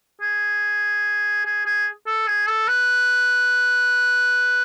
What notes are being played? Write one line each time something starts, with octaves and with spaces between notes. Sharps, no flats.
G#4
G#4
G#4
A4
G#4
A4
B4